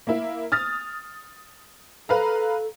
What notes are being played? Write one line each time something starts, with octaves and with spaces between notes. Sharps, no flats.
A#3 E4
D#6 F6 A6
A4 B4 F5 A#5